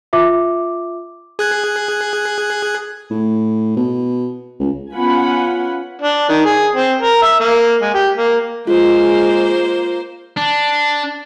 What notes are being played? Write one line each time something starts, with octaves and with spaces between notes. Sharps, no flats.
F4 E5 D6
G#4 F#6 G#6
A2
B2
C#2
B3 C#4 F4 F#5 G#5 B5
D4
D#3
G#4
C4
A#4
E5
A#3
G#3
G4
A#3
G#3 A#3 F4 C5
D4